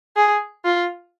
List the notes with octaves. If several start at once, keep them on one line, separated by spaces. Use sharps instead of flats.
G#4
F4